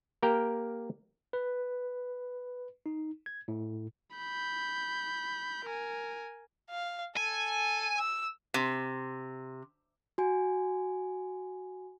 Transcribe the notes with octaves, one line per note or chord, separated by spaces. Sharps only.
A#3 G4 A#4 G5
B4
D#4
G#6
A2
B5 G6
A#4 G#5
F5
A4 G#5
E6
C3
F#4 G#5